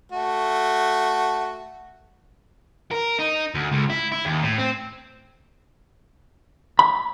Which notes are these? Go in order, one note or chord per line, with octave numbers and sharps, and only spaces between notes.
A3 F#4
A#4
D#4
D2
C#2
E4
E4
D#2
A2
C4
B5